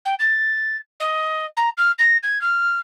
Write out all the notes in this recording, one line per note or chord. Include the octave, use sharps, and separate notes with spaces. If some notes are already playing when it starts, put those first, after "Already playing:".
G5
A6
D#5
A#5
F6
A#6
G#6
F6